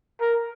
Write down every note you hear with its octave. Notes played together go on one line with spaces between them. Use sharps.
A#4